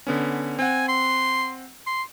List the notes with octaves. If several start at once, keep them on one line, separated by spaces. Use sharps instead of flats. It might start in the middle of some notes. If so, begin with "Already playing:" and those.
D3 B3 C#4
C4 F#5 G#5
C6
C6